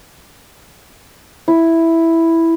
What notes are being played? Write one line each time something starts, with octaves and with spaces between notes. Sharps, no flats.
E4